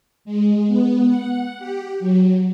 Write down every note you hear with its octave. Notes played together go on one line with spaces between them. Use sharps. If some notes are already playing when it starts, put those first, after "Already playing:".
G#3
B3
F#5
G4
F#3